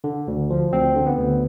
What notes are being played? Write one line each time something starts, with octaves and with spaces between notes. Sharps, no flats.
D3
D2
F3
D2 C4
D3
B3
D2